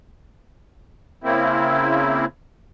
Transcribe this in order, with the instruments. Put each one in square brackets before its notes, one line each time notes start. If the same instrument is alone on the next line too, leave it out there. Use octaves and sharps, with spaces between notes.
[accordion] C#3 A#3 C4 E4